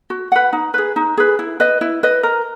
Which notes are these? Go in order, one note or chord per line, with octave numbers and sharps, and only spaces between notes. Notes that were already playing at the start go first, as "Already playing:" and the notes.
F#4
B4 F#5
D#4
G#4 B4
D#4
G#4 B4
E4
B4 D#5
E4
B4 D#5
A#4